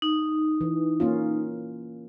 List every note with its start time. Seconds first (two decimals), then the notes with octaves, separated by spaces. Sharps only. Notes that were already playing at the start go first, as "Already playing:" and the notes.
0.02 D#4
0.61 E3
1.00 A#3 C#4 F4